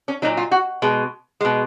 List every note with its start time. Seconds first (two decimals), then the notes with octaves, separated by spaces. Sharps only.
0.08 C#4
0.22 A#2 F#3 D#4
0.37 F4
0.51 F#4
0.82 B2 G#3
1.41 B2 G#3